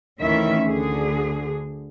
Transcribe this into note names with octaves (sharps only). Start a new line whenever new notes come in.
D2 D#3 E3 C#4 E5
D2 D3 G#4